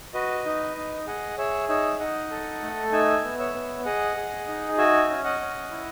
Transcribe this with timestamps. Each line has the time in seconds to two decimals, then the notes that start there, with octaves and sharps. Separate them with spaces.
0.14 F#4 B4 D#5
0.45 D#4
0.76 D#4
1.07 G#4 D#5 F#5
1.38 G#4 C#5 E5
1.69 D#4 C#5 E5
2.00 D#4 D#5 F#5
2.31 A4
2.62 A3
2.92 D#4 E5 G#5
3.24 B3
3.39 C#5 E5
3.55 B3
3.85 G#4 D#5 F#5
4.17 G#4
4.47 D#4
4.78 F#4 E5 G#5
5.10 C#4
5.25 D#5 F#5
5.40 C#4
5.71 E4